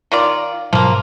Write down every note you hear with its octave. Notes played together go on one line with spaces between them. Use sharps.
D#3 F4 D5
G#2 B2 F3 F#3 A#3